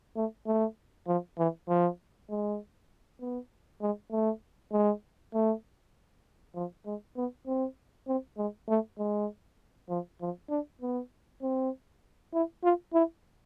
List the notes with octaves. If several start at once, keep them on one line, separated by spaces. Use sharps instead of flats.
A3
A3
F3
E3
F3
G#3
B3
G#3
A3
G#3
A3
F3
G#3
B3
C4
C4
G#3
A3
G#3
F3
F3
D4
B3
C4
E4
F4
E4